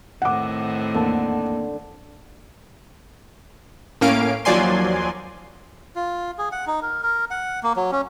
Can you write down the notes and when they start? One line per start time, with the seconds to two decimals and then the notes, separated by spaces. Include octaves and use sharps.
0.22 A2 D#3 C4 F#5 D6
0.94 E2 D3 A#3 A5
4.01 A2 A#3 C#4 F5 D7
4.45 D#2 F3 F#3 D5 G#5 C6
5.96 F4
6.38 G#4
6.52 F#5
6.67 D#4
6.83 A#4
7.03 A#4
7.31 F#5
7.63 A#3
7.76 F#3
7.92 C#4